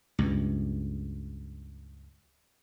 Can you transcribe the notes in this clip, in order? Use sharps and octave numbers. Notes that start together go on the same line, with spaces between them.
C#2 G2